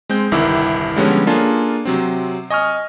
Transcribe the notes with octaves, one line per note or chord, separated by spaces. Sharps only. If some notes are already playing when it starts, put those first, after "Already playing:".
G#3 C4 G6
G1 C2 D#3 E4 D6 E6
D3 F3 G3 G#3 B3 C#4
A#3 D4 F4 G#4 A4
C3 F#3 C4
D#5 G#5 C#6 D#6 F6